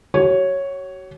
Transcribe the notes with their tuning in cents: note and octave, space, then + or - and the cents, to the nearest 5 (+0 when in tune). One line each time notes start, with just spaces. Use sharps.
F#4 +40 C#5 -5